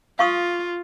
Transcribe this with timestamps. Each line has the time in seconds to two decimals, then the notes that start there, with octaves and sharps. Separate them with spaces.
0.19 F4 F5 C#6 D#6